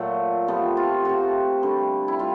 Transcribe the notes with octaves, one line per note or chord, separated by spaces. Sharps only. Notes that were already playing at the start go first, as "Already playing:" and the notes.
Already playing: A#2 F#3 A3
C3 F3 A3 B3
F4
C3 F3 A3 F#4
D3 G3
E4
G3 F4